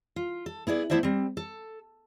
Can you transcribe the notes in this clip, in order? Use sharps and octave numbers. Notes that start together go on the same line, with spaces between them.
F4
A4
B3 E4 G#4 D5
A3 B3 E4 C5 D5 E5
G3 C4
A4